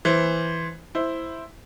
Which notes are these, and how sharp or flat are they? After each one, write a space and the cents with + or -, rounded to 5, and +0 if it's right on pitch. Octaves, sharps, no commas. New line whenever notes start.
E3 +0 C5 +5
E4 +0 C5 +0